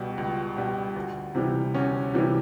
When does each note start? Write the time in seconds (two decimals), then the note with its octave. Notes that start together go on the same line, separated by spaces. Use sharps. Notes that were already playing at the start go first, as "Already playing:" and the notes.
Already playing: C#2 B2 G3
0.18 C#2
0.56 B2 G3
0.96 D2
1.35 C3 E3 G3
1.75 D2 C#4
2.14 C3 E3 G3